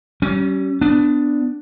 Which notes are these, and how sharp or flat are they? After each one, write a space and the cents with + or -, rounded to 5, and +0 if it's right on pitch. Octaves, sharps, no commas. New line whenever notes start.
G3 -40 C#4 +0
B3 +20 D4 +0